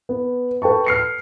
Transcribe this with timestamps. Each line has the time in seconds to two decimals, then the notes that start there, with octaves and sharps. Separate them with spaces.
0.09 B3
0.62 A4 B4 G5 A5 C#6
0.86 F6 C7 C#7